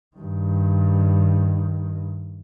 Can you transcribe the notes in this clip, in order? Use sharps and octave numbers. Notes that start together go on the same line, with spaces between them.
G2 D#3